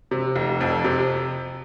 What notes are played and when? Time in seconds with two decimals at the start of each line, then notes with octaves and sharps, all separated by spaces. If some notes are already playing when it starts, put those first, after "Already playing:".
0.11 C3
0.36 F1
0.61 F2
0.84 C3